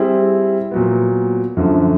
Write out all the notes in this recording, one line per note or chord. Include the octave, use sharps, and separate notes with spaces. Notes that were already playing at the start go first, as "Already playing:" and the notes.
Already playing: G3 C4 E4 G#4
A#2 F#3 B3
F#2 D3 F3 A3